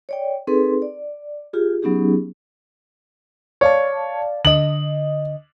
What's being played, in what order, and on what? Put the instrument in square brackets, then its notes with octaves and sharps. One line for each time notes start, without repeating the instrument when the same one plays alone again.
[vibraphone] C#5 D5 G5
C4 D#4 G#4 A4 B4 C6
D5
F4 G4 G#4
F#3 B3 C#4 D#4 G4 G#4
[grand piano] C#5 [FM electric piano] D5 F5 A5
[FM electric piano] D3 D#5 [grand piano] F#7